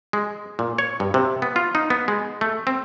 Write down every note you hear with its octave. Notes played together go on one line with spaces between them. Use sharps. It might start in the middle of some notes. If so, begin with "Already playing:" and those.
G#3
A#2
C#5
G2
C3
B3
F4
D#4
B3
G#3
A3
C4